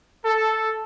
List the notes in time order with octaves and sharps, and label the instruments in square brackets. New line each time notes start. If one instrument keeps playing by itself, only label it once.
[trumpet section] A4